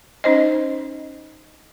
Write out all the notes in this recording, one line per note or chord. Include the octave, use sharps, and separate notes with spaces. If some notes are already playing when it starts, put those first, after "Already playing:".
C#4 D#4 C5 D#5